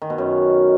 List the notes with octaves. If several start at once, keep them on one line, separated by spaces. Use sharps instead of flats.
D#3
B2
F#2